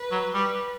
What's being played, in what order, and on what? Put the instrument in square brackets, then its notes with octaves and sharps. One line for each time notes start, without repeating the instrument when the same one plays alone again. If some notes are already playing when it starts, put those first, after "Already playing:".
Already playing: [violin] B4
[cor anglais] F#3
[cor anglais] G3 [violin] B4